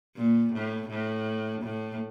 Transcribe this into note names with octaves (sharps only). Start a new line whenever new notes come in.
A#2
A2
A2
A2